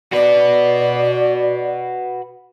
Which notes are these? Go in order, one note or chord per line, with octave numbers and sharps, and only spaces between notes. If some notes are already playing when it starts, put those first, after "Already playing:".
F#4 B4 D5